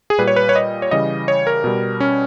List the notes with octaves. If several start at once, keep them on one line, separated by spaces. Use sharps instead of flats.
G#4
A#2 G3 B4
C#5
B4
C#5
D#5
C#5
C#3 E3 G3 D#5
C#5
A#4
B2 G3
C#4